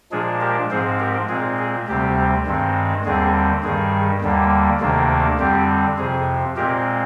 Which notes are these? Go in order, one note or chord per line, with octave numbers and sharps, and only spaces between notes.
A#2 F3 G#3 D4 G#4
G4 A#4
G#2 F3 G#3 C4 G#4 C5
G4 A#4
A#2 G#3 C4 G#4
G#4
D2 C3 G3 C4 G4
G2 D#3 G#3 C4
D#2 D3 G3 C4 G#4
G2 D#3 G3 G#4
D#2 D3 G3 A#3
D2 C3 D#3 A#3 D4
F2 D3 G3 C4 G4
F2 C3 F3 G#4
A#2 G#3 C4 G4 A#4